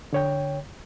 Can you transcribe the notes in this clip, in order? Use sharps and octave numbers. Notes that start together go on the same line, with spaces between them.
D3 C#5 G5